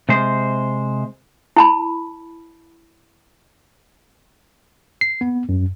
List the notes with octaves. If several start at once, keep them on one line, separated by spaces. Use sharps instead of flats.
C3 G#3 C5
E4 A5 B5
C7
B3
F#2